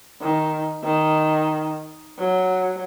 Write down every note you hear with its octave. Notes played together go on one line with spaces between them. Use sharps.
D#3
D#3
F#3